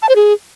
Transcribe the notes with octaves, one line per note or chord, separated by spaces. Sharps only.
A5
C5
G#4